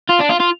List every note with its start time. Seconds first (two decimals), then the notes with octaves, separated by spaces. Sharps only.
0.09 F4
0.20 D4
0.30 F4
0.40 F4